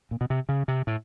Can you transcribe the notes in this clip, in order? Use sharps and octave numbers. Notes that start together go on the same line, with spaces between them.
A#2
B2
C3
C#3
C3
A2